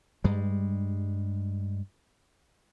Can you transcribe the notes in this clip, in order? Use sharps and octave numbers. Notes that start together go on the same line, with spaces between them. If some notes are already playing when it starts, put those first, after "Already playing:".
G2 G3 G#3